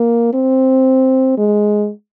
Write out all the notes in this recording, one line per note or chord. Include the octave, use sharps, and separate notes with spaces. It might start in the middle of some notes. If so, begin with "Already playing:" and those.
Already playing: A#3
C4
G#3